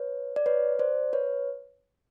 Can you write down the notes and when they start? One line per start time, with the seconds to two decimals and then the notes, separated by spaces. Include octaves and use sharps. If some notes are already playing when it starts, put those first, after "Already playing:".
Already playing: B4 C#5
0.36 D5
0.46 B4 C#5
0.79 C5 D5
1.13 B4 C#5